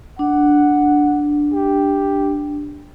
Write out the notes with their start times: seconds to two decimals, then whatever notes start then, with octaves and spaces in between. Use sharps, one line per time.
0.19 D4 F#5
1.53 G4